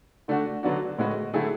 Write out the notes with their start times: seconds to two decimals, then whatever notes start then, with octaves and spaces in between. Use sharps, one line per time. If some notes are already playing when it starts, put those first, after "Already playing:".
0.28 D3 A3 D4 F#4
0.63 D3 F#3 B3 D4 F#4
0.98 A2 G#3 B3 F#4 B4
1.33 D3 F#3 A3 E4 G#4